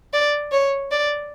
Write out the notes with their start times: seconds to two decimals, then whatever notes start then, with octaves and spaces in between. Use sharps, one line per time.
0.13 D5
0.52 C#5
0.91 D5